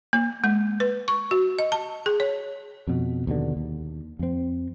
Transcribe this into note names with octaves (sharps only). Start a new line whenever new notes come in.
A#3
G#3
B4
C#6
F#4
D#5
A5
G#4
C#5
F2 B2
D#2 B2 D3
D#2
F2 C4